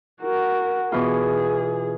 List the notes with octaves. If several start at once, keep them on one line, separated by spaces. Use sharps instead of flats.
F#4 A#4
B2 E3 F4 G#4